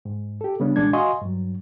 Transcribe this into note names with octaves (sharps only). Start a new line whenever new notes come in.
G#2
G4 A4
C#3 G3 B3 C#4 D4
C2 A#2 E3 G#3 D4 G#6
F#4 D#5 F5 G#5 C6 C#6
G2 F#3